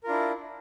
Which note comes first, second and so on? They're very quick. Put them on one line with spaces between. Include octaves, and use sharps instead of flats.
A#4 F4 D4 E4